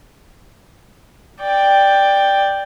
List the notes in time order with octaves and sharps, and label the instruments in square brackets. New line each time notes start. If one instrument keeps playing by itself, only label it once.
[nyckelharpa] D5 G5